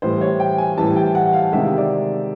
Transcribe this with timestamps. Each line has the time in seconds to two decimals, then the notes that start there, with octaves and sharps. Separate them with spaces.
0.02 A2 E3 G3 C5
0.21 C#5
0.40 G5
0.58 G#5
0.77 A2 E3 G3 A5
0.96 G5
1.15 F#5
1.33 F5
1.53 C3 D#3 G#3 E5
1.77 D5